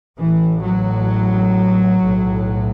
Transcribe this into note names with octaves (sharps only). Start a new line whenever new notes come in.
A1 A2 E3
F#3
B1 A2